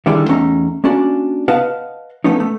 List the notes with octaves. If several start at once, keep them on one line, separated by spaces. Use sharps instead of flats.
D3 D#3 G3 G#3 E4 D5
E2 A3 C#4 D#4
A#3 C#4 D4 F#4 D5
B4 D#5 F5 F#5 A5
F3 A3 B3 C#4 D#4
A3